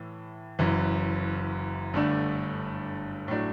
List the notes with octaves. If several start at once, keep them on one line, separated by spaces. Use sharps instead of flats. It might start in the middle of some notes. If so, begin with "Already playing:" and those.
Already playing: A2 E3
F#1 F#2 E3
G1 G2 D3 A3 D4
A2 F#3 A3 D4